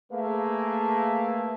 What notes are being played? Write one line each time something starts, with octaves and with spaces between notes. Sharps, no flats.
A3 A#3 G#4 B4 E5 F5